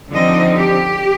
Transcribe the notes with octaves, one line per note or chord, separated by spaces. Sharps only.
D3 F3 C4 D#4 D#5
G4